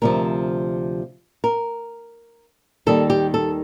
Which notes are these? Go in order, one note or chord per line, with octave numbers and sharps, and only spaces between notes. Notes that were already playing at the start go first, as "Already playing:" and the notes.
D2 C3 F3 A#4
A#4
D#2 D#3 G3 A4
G4
A4